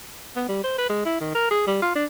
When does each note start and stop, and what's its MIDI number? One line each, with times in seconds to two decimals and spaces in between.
0.36 0.44 59
0.48 0.63 55
0.64 0.77 72
0.78 0.89 71
0.89 1.04 56
1.05 1.19 64
1.20 1.33 51
1.35 1.49 70
1.51 1.63 68
1.67 1.77 55
1.82 1.90 65
1.95 2.05 62